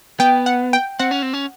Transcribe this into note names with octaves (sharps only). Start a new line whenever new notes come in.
B3 G5
F#5
G5
C4 F#5
C#4
C4
C#4